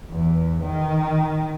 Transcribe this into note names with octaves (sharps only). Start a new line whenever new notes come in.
E2
D#3